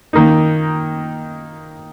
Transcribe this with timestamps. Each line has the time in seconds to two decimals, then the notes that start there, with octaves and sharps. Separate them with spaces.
0.13 D#3 A#3 D#4